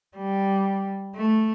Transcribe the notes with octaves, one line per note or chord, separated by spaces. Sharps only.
G3
A3